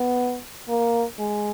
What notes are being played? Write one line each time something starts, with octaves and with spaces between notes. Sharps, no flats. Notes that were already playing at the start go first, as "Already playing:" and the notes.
Already playing: B3
A#3
G#3